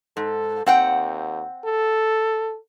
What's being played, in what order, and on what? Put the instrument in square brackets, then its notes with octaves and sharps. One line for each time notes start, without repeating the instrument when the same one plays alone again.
[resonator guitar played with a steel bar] G#2 [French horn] A4
[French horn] D#2 [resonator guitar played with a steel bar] C4 F#5 G5
[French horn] A4